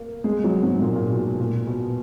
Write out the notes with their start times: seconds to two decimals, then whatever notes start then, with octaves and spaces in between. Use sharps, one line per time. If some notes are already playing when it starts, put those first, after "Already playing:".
Already playing: A#3
0.24 G#3
0.44 F#3
0.63 G#2
0.73 G#2
0.81 A#2
0.96 A#2
1.10 B2
1.39 A#2
1.67 B2